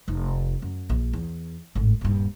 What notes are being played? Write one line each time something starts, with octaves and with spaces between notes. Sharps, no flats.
F1 D#4
F#2
A#1
E2
G#1 A2
D#1 G2